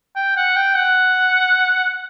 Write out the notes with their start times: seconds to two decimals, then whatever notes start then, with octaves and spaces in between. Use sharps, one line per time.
0.16 G5
0.36 F#5
0.56 G5
0.77 F#5